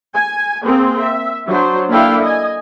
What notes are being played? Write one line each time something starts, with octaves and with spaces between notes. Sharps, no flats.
G#5
A#3 C4 G#4
E5
F#3 D4 C5
A#3 D4 E4 A4 F5 G5
D#5 G#5